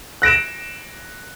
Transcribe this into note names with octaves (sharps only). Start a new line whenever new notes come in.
F#6 A#6 D7 E7